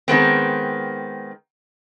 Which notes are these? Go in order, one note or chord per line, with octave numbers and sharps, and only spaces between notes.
D#3 G#3 B3 C4